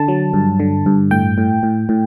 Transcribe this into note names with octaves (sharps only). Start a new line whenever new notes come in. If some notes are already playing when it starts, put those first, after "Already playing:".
Already playing: D3 A5
F#3
G2
D3
G2
A2 G5
A2
A2
A2